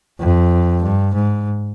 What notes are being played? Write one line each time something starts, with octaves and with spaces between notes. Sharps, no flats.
F2
G2
G#2